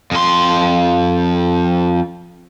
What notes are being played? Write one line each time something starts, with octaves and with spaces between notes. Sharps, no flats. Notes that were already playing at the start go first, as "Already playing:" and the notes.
F2 C6